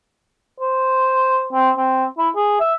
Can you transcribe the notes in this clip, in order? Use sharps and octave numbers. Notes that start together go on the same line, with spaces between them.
C5
C4
C4
E4
G#4
E5